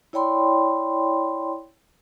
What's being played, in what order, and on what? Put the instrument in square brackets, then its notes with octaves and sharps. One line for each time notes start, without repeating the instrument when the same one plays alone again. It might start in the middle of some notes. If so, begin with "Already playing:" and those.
[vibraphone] E4 C#5 D5 G5 B5 C6